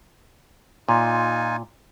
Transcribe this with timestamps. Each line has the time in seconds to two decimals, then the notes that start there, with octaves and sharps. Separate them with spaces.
0.89 A#2 D#4 F4 G#5